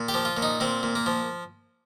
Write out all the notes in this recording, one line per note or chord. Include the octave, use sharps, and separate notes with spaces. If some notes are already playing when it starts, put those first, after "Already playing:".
Already playing: A#2
G4
F3
F4
A#2
D#4
A#2 C4
A#2
A#3
F3